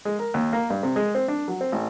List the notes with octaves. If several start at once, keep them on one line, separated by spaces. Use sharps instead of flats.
G#3
A#4
D#2
A#3
G2
C3
G#3
C4
D4
F#3
C4
A1